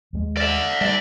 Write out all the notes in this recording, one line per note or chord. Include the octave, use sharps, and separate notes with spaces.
D#2 G3 G#3
D5 E5
G3 D5 E5